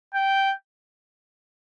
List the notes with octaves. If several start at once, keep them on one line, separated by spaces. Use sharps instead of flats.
G5